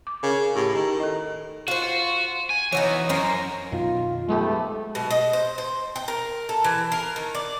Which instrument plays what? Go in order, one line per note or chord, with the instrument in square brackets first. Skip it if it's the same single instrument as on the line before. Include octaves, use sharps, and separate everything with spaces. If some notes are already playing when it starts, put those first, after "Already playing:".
[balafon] D6
[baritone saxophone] C#3 [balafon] A#4
[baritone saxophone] A2 [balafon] E4 G4
[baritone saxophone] D#3 [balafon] G4
[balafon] A4 D#5
[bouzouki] F4 C5 [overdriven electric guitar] F#4
[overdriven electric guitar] F#4
G#5
[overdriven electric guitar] E3 B3 [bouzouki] D#4 F#4 C#5
[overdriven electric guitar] F#2 [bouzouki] C#4 A#4 C5
[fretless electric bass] F#2 B2 [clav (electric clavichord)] D#3 [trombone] F4
[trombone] G#2 [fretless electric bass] F#3 [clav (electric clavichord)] G#3 B3 G4 [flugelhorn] A3
[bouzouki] B2
D#5
C5
C5
G5
A#4
A4
E3
A#4
D#3
D5